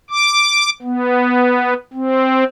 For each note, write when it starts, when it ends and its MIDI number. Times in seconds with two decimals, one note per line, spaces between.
0.10 0.70 86
0.82 1.74 59
1.93 2.44 60